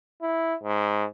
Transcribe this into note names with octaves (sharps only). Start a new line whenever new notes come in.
E4
G#2